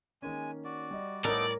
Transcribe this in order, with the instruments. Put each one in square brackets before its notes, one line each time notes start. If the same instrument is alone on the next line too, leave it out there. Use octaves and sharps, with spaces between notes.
[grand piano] D#3 A#3 C#4 [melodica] G#3 G#5
[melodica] F#4 D5
[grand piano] G3 D#5
[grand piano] A2 G3 C#5 [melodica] B3 D#4 A4 [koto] A#4 [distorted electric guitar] D5